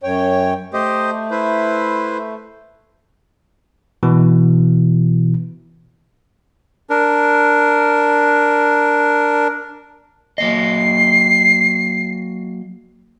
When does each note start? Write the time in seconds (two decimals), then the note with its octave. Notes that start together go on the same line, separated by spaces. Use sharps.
0.03 F#2 C#5 G5
0.73 A3 G4 C5 D#5
1.31 E4 B4 C5
4.03 B2 E3
6.90 D4 A#4
10.38 F#3 A#3 D#5 C7